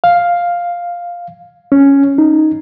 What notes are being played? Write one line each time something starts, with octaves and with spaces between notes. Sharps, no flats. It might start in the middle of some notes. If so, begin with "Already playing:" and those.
F5
C#4
D#4